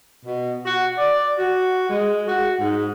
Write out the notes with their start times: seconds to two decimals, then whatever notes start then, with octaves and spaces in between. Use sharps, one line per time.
0.25 B2
0.66 F#4
0.98 D5
1.37 F#4
1.90 G#3
2.28 F#4
2.60 G#2